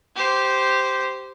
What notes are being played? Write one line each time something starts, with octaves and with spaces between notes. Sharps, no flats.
G4 C5